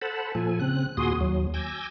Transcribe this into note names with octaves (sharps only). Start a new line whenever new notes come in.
A4 C5 F#5 A5 B5
A#2 F3 A4 G#5
C#3 C4 F#6
D#2 A#2 F#4 G#4 C6 D#6
D#2 F#3
G#5 D6 E6 G6 G#6 A#6